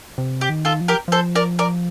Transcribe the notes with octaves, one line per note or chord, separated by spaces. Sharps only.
C3
G4
D#3
F4 A4
F3
G4 A#4
F3 A4 C5
A#4 D5
A#4 D5